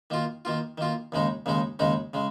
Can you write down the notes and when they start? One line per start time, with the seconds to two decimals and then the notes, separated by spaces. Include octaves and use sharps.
0.10 D#3 A#3 F4
0.45 D#3 A#3 F4
0.78 D#3 A#3 F4
1.12 D#2 C#3 G#3 D#4
1.46 D#2 C#3 G#3 D#4
1.79 D#2 C#3 G#3 D#4
2.13 C#3 G#3